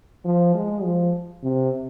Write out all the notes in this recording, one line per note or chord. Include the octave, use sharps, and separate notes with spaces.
F3
G#3
F3
C3